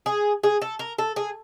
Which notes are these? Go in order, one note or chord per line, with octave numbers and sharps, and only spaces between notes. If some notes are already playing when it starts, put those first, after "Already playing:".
G#4
G#4
A4
A#4
A4
G#4